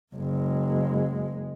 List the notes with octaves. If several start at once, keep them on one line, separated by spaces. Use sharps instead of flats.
F#1 G#3